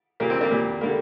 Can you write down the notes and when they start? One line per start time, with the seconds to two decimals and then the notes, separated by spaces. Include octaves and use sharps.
0.20 A#2 G3 A#3
0.30 C4
0.40 A#3 D4
0.51 A#2 G3 A#3
0.81 D3 G3 A#3